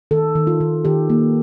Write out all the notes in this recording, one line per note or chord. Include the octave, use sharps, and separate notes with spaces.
D#3 A4
D#3
F4
D#3
D#3 G4
A#3